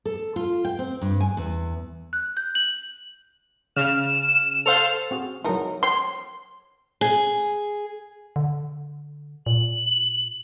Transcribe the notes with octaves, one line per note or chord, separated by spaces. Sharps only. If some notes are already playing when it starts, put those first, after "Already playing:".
A4
F4
G5
C4
G2
G#5
E2
F#6
G6
F#7
C#3 F6 E7
A4 C5 F5 F7
C4 F#4 G#4
F#3 G#3 B3 D#4 E4 A#4
C5 C#5 G5 C6
G#4
D3
A#2 F#7